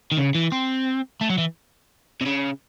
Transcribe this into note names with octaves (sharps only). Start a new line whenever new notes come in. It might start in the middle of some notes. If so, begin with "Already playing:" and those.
D#3
C#3
E3
C4
A3
F#3
E3
C3
C#3